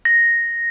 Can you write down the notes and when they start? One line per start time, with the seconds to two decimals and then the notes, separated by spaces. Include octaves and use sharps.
0.05 A#6